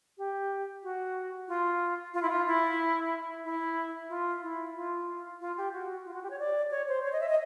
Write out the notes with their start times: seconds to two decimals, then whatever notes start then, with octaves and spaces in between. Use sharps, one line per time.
0.18 G4
0.83 F#4
1.48 F4
2.14 F4
2.22 E4
2.29 F4
2.47 E4
3.44 E4
4.09 F4
4.43 E4
4.76 F4
5.41 F4
5.57 G4
5.73 F#4
6.05 F4
6.14 F#4
6.23 G4
6.30 C#5
6.39 D5
6.71 C#5
6.88 C5
7.03 C#5
7.12 D#5
7.20 E5
7.29 D#5